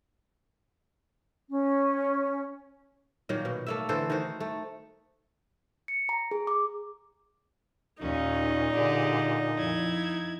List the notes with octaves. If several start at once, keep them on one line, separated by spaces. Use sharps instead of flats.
C#4
A#2 D#3 F#3 A#3
B2
A3 A#3 E5
D3 E3 A4 C5
D#3 D#4 F#4 C5
A3
C#7
A#5
G#4
D6
D#2 A#2 C#4 D#4
D3 G4 G#4
F2 E4 G#6